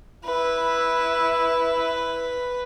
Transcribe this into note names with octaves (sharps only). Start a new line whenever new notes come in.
E4 B4